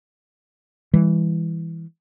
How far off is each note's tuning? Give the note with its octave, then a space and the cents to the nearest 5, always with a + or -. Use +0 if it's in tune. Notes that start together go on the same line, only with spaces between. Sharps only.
E3 +0 G3 +45